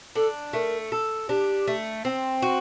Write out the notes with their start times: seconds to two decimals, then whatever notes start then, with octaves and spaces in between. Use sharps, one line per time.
0.15 D4 A4
0.53 A3 A#4
0.92 A4
1.29 D4 G4
1.68 A3
2.05 C4
2.42 F#4